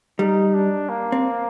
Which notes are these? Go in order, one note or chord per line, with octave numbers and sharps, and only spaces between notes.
G3 D#4
D4
A#3
C4